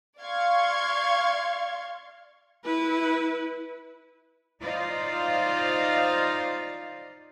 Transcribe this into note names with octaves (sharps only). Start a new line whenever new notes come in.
D5 F5 C6 C#6 G#6
E4 B4
D#4 F4 C5 D5 D#5 F5